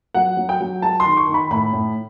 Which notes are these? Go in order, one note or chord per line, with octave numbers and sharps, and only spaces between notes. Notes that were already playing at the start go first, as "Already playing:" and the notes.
F#3 F#5
F#3
G5
F#3
G#3 A5
C6
D#3
C#6
D#3
B5
A2 B5
A2